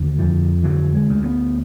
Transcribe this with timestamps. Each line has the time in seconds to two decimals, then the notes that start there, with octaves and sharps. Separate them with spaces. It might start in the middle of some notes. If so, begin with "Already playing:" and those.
Already playing: D#2 D3
0.19 F2 F3
0.64 D3 F#3
0.94 G#3
1.10 D2
1.24 B3